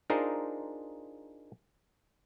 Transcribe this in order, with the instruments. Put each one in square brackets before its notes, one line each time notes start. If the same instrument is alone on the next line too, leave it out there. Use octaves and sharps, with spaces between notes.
[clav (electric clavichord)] D4 D#4 F4 G#4 A#4 C5